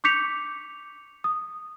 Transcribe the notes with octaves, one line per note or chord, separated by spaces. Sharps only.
C#6 D6 G6 B6 C#7 F7
D#6